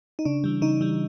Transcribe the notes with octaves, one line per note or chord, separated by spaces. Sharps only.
D#4
C#3 D4
E3 G3
C#3 D#4
E3 G3